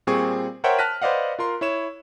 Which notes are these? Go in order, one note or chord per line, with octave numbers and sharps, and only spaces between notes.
A#2 G3 C4 G#4 C#6
A#4 C5 C#5 E5 F#5 G5
A5 F6 F#6 A#6 B6 D#7
B4 C5 D5 D#5 F5 F#5
F4 A#4 C6
E4 C#5 E7